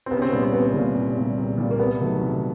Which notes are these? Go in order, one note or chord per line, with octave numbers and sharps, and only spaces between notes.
C4
C2 B3
C#4
C4
A#2 G3 B3
C4
C2 B3
A#2 G3
C2
A#2 G3
C2
A#2 G3
A#3
C2 B3
C3 D#3 F#3 A3
C2